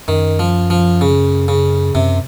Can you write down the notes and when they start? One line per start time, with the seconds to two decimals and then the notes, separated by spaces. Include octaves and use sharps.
0.08 F#2 D#3
0.39 F3
0.70 F3
1.01 C#3
1.48 C#3
1.95 F#2 C3